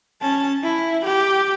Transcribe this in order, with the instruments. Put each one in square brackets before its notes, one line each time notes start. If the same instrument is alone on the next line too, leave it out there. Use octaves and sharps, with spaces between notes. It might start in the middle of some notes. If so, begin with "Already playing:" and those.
[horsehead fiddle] C#4 A5
E4
G4